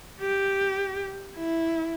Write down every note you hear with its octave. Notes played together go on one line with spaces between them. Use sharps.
G4
E4